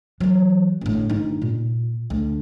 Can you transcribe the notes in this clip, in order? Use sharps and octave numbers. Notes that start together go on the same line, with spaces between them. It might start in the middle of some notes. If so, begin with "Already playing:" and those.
E3 F#3
G1 A2
G1 D#4
A#2
D2